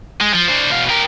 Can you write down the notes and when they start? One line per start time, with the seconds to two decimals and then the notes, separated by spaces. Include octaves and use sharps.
0.21 G#3
0.34 F3
0.48 D4 C5
0.71 B2 F5
0.89 G4 A#4